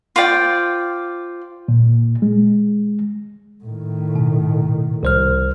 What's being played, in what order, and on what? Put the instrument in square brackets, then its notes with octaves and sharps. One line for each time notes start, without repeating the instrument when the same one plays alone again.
[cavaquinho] F4 C5 D5 G5
[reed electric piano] A#2
G#3
[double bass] A2 D#3
[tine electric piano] B2
C2 C5 F6